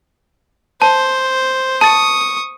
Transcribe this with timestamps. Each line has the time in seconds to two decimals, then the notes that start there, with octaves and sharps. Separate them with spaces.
0.82 C5 A5
1.81 A5 C#6 D#6 A6